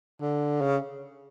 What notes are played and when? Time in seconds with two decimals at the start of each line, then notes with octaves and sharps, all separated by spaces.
0.21 D3
0.61 C#3